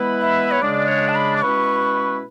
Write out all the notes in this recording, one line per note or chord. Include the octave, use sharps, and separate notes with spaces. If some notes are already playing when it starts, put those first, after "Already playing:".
Already playing: E3 G#3 B3 E4 B4
E5
C#5
C#3 G#3 D4 D5
C#5
A5
B5
D6
B2 G#3 C#4 E4 B4 C#6